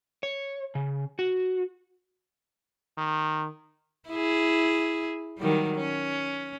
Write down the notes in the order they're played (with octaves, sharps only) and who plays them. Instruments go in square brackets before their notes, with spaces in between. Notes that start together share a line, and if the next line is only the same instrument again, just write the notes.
[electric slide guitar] C#5
C#3
F#4
[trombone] D#3
[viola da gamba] E4 G#4
D#3 F#3 G3
C#4